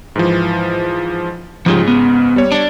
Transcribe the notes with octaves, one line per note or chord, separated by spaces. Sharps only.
G#2 E3 F3
G#2 C#3 F3 F4 G4
B3
G3 C#5
D4 D5